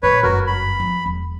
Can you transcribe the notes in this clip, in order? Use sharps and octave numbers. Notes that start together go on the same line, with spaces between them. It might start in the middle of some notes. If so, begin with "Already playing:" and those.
G2 A#2 B4 C#5
F#1 G2 F#4 A#4
B5
F3 B3
E1